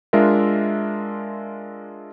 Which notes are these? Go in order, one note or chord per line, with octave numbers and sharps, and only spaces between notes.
G#3 D4 F4 A#4 E5